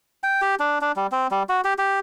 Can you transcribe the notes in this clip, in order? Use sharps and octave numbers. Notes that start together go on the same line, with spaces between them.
G5
G4
D4
D4
G3
C4
G3
F#4
G4
G4